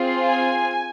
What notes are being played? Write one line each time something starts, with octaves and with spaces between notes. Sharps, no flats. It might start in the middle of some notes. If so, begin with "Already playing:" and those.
Already playing: C4 F4 G#4
G#5